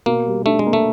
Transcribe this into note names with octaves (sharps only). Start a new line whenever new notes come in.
B2 A#3
G3
A3 D4
G#3
A#3
A3